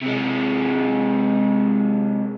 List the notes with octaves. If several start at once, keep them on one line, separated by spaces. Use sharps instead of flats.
C3 G#3